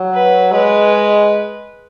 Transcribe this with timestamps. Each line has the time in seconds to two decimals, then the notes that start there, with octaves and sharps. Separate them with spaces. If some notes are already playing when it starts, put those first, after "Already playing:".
Already playing: F#3
0.13 B4
0.52 G#3 B4